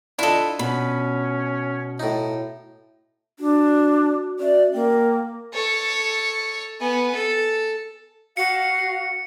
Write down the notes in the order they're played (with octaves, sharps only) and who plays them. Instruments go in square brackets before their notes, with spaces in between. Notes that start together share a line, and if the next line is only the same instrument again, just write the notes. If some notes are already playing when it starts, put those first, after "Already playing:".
[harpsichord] D4 F4 D#5 [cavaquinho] E4 A4
[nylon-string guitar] B2 [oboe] C#4 [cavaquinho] B5
[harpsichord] A2 D#4
[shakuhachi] D4 [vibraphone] F#4
[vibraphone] F#4
[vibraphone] C#4 F#4 E5 [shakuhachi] D5
[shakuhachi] A#3 [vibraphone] G5
[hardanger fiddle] A4 C#5
B3 G#5
A4
[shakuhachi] F#4 [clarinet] F5 [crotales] C#7